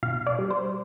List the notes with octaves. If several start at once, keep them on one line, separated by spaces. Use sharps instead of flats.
B2 F5
D5
G3
C5